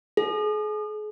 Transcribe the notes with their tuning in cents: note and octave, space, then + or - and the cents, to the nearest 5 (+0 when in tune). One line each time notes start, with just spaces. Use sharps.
G#4 +40